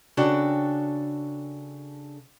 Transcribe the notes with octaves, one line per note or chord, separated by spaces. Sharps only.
C#3 D4 F#4 A4 G5